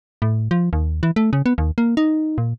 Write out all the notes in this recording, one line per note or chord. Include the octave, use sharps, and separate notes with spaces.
A2
F3
D#2
E3
A3
C#3
B3
D#2
A#3
D#4
A#2